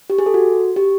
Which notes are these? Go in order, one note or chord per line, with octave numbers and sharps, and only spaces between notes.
G4
G#4
A4
F#4
G4